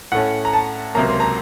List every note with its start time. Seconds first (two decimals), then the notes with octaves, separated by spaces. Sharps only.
0.12 A2 A3 C#4 F#5
0.45 A#5
0.53 A5
0.95 C#2 C3 F#3 A#3 A#5
1.08 C6
1.20 A#5